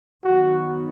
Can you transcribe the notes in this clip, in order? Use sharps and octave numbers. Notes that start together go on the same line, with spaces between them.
D#3 F#3 B3 F#4